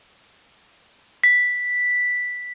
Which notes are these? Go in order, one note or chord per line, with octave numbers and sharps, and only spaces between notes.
B6